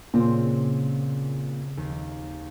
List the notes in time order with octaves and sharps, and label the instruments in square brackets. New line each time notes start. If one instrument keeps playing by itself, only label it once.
[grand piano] A#2 [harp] C#3 C4
[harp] D#2